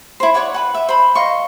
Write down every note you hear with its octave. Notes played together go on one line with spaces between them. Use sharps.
E4 C5
C#5 D5 F#5 C#6
B4 F#5
E5
C5 B5
D#5 F5 C6 C#6